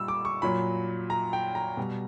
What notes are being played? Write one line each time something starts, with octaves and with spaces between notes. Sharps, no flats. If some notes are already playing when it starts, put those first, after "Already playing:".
Already playing: A#2 G3 E6
D6
C#6
A#2 F#3 B5
A#5
G5
A#5
B2 G3